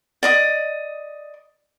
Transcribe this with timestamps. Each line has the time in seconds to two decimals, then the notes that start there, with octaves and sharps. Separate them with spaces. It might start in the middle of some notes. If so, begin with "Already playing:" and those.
0.23 D5 D#5 D#6